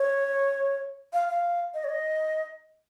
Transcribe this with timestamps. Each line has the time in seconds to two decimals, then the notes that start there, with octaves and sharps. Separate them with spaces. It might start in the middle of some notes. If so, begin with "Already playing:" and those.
Already playing: C#5
1.13 F5
1.29 F5
1.74 D#5
1.84 C#5
1.89 D#5